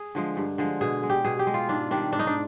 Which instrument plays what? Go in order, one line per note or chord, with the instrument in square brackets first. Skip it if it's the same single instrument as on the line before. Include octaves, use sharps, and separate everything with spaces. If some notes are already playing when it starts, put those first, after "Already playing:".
Already playing: [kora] G#4
D3 F3 G#3
G2
D3 F3 G#3
B2 G#4
G#3
G4
B2 G#4
G4
G#3
F4
G#2 D4
D#3 G3 D4
G#2 D4
D#4
D4